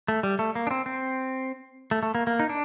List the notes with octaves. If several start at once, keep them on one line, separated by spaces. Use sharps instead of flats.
A3
G3
A3
A#3
D4
C4
C4
A3
A3
A#3
A#3
D#4
D4